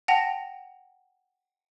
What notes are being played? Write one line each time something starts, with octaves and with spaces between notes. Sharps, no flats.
F#5 G5 A5 A#6 F7